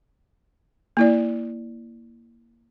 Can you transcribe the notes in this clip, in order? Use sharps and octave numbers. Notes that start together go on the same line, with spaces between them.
A#3 E4 D5